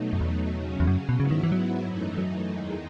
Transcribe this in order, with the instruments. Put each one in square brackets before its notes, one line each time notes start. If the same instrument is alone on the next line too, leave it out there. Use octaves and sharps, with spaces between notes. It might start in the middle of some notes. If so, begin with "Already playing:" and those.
Already playing: [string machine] B2 F#3 A3 D#4
[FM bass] F#2
E2
[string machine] C#3 F#3 C#4
[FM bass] E2
F#2
B2
[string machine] G#2 F#3 B3 E4 [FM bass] C#3
[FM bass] D#3
E3
F#3
[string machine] F#2 E3 A3 D#4
[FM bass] F#3
[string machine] E2 D#3 G#3 D#4